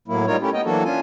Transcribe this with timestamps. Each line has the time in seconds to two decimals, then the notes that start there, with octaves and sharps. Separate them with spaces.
0.08 A2 F#3 A#3 E4
0.27 G3 D#4 F4 A#4 C#5
0.41 A3 C#4 E4 G4
0.53 B3 D#5 G5
0.65 E3 F#3 A#3 D4 F#4 A4
0.84 C#4 D4 F4 G#5